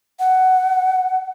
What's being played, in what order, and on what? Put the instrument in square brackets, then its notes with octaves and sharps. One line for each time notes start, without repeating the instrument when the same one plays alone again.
[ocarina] F#5